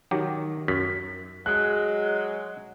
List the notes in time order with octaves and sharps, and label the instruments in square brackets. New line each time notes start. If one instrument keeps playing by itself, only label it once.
[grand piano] D#3 [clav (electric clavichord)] F#3 G4
[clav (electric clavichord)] F#2 [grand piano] B6
[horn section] F#3 G#3 [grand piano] F#6